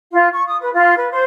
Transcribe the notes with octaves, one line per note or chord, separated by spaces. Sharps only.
F4
C#6
D#6
B4
F4
B4
C5